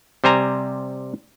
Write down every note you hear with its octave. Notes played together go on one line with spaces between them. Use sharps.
C3 G3 C5 G#5 A#5